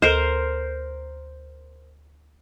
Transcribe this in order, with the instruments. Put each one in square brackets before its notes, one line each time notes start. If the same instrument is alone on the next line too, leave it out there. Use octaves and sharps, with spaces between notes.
[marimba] D2 A4 [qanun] A#4 C5